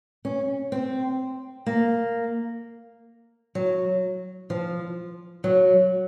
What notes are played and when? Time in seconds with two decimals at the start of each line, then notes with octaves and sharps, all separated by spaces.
0.25 C#4
0.72 C4
1.66 A#3
3.55 F#3
4.50 F3
5.44 F#3